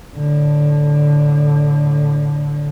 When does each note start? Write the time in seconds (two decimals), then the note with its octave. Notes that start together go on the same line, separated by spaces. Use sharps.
0.16 A2 D3